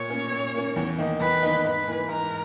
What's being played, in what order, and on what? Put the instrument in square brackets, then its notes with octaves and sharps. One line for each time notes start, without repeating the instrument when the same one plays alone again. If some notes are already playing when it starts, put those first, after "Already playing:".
Already playing: [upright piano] A#2 [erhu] C#5
[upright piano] A#3 C#4
A#2
A#3 C#4
E2
D#3 A#3 D#4
[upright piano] E2 [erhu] B4
[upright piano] D#3 A#3 D#4
[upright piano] G#2 [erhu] B4
[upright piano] E3 A#3
[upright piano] G#2 [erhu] A#4